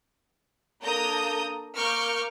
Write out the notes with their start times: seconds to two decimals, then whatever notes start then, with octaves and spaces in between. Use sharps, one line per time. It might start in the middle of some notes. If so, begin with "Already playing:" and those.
0.83 A#3 D4 A4 A#5 D#6 G6
1.75 A#3 A#4 C#6 D6 F6 G6